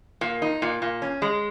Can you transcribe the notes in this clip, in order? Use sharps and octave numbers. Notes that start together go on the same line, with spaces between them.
A#2
D#4
A#2
A#2
C#4
G#3